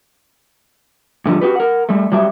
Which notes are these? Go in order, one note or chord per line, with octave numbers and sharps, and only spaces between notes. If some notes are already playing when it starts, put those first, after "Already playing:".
G#2 D3 F3 G3
F#4 G4 B4
A#4 F#5
G3 A3
F#3 G3 G4 E5